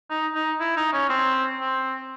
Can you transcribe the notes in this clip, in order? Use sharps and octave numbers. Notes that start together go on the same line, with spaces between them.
D#4
D#4
E4
D#4
C#4
C4
C4